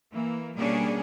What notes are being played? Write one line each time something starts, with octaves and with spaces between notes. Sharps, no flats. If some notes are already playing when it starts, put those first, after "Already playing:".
E3 A#3
B2 G3 A#3 C#4 D4 G#4